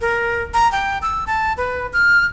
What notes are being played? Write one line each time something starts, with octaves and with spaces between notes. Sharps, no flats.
A#4
A#5
G5
E6
A5
B4
F6